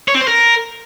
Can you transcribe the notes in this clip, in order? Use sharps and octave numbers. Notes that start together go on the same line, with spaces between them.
C#5
C4
C5
A#4